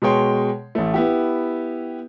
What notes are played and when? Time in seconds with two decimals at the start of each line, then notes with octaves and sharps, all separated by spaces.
0.02 B2 G#3 G#4 C#5 G5 C6
0.75 A1 A3
0.94 B3 E4 G4